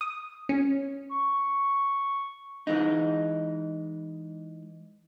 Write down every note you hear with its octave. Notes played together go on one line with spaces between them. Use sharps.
D#6
C#4
C#6
E3 G#3 D#4